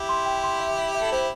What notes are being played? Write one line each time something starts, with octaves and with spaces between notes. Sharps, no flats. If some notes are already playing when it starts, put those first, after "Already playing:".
Already playing: E4 G4
C6
G5
C6
E5
E5
E5
A4
E4 G4 C5